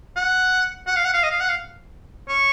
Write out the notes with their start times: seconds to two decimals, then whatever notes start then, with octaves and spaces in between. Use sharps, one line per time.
0.16 F#5
0.87 F#5
0.96 F5
1.05 F#5
1.14 F5
1.23 D#5
1.31 F5
1.40 F#5
1.49 F5
2.29 C#5